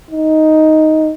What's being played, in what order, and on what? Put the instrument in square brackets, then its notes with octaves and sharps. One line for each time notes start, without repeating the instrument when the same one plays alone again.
[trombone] D#4